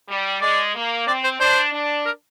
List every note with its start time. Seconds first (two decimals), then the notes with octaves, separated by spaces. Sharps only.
0.09 G3
0.41 G#3 D5
0.75 A#3
1.07 C4 D5
1.24 C5
1.40 D4 C5
1.73 D4
2.06 A#4